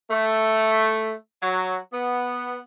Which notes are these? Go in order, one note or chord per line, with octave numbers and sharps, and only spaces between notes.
A3
F#3
B3